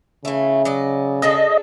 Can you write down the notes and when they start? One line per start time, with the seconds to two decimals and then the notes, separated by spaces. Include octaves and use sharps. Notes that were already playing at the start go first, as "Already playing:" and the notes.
0.25 C#3 E3 A3
0.65 F#3 D5 D#5
1.22 D4 G#4 A4 D#5